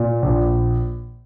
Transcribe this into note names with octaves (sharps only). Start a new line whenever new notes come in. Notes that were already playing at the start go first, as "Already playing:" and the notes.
Already playing: A#2
A#1